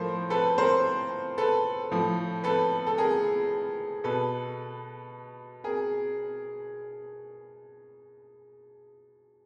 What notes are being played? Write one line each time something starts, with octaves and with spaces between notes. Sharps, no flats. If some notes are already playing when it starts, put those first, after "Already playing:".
Already playing: A2 F3 A#4 C5
A4 B4
A#4 C5
A4 B4
A2 F3
A4 B4
A4
G#4 A#4
B2 A4 B4
G#4 A#4